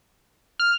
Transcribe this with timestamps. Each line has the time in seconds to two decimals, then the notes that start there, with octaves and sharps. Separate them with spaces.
0.60 F6